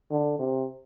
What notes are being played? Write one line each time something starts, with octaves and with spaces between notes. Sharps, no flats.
D3
C3